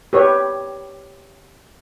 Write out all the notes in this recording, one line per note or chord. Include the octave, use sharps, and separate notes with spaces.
G4 B4 C#5